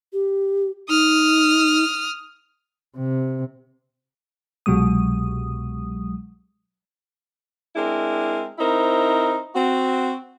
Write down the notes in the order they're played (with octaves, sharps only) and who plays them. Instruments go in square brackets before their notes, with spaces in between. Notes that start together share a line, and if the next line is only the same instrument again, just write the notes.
[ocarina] G4
[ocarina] D#4 [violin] D#6 F6
[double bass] C3
[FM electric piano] C2 B2 F#3 G#3 D#6
[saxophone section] G#3 C4 D4 E4 A#4
C4 D#4 E4 A#4 C5
C4 F#4